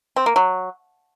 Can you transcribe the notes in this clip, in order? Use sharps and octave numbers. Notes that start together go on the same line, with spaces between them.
C4
A#3
F#3